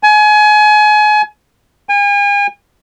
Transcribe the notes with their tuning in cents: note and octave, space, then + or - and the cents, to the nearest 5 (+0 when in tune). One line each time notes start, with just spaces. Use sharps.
G#5 +30
G#5 -40